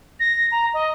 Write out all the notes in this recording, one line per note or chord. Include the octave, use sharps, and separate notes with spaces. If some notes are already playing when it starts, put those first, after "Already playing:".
A#6
A#5
D#5